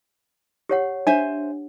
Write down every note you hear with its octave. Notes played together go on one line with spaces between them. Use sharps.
G4 C#5 F#5
D4 C5 E5 G#5